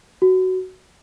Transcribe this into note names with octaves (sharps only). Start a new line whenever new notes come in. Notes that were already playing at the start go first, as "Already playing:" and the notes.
F#4